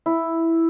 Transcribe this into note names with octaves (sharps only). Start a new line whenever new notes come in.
E4